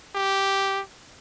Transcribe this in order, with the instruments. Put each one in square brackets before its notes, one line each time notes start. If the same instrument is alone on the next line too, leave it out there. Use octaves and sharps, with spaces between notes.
[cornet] G4